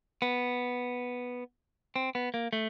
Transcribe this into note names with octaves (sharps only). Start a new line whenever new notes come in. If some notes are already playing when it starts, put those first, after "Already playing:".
B3
C4
B3
A#3
A3